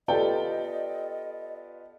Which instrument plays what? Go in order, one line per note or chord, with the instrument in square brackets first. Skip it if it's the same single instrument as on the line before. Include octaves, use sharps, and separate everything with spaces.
[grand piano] B3 F4 G4 [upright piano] A4 D5 G5 [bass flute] D#5